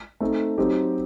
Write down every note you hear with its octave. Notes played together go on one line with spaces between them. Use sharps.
A3 C4 D#4 A4
F#3 C4 D#4 G4